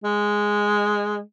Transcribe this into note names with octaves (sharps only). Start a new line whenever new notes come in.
G#3